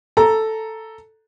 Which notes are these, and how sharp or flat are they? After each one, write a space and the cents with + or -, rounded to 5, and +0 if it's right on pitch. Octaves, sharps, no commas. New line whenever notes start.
A4 +0 A#5 +0